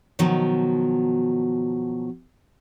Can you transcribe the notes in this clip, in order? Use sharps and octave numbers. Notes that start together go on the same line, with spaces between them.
B2 D#3 F3 F#3